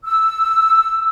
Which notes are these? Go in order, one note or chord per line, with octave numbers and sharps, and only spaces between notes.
E6